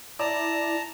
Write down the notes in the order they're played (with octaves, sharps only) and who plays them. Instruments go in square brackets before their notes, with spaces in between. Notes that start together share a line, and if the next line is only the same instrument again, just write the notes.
[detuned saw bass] E4 [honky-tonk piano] D5 [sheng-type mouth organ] A5 A#5